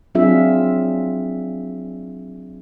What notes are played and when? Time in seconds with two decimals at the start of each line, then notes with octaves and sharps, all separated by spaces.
0.15 F#3 C4 D4 F4 G#4 E5